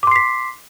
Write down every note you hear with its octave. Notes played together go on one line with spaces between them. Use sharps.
C6 D6 B6 C7